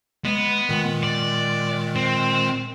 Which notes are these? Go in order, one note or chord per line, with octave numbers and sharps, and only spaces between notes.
G#3 B3
A#2 D#3 G#3
D5
C4